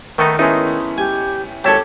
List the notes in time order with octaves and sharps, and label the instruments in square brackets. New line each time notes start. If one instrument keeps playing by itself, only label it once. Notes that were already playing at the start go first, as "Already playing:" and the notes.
[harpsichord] D#3 [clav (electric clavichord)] A3 B3 D#4
[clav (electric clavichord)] G#3 A3 D#4 [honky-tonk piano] B3 C#4 E4
[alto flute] G4 [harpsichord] G#5
[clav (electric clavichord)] G#1 E5 A5 [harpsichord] G4 A4 [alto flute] C#5